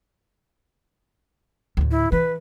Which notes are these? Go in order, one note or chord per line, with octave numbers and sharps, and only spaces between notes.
D2 A2
E4
E3 B4